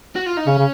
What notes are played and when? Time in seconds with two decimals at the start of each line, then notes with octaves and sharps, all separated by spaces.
0.15 F#4
0.26 F4
0.37 D#4
0.47 C#3 C#4
0.58 C#3